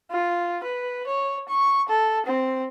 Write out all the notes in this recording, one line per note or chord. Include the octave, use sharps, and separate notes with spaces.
F4
B4
C#5
C#6
A4
C4